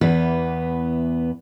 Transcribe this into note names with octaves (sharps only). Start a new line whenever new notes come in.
E2 E3 B3 B4